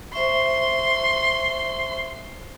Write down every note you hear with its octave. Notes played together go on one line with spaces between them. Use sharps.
C5 E5 C6 C#6